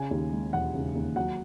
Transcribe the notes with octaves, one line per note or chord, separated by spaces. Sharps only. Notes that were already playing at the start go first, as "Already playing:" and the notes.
Already playing: C#3 G#5
D#2
G#3
E1 F#5
C#3
D#2
F#3 F#5